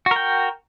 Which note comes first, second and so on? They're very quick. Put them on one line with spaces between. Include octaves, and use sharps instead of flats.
F#4 A#4 G5